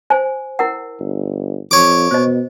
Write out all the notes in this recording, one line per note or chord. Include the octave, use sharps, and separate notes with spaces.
C5 G#5
E4 A#4 F#5
G1
F2 C#5 D6
B2 C5 D#5